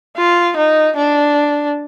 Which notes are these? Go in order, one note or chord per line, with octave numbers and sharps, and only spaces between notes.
F4
D#4
D4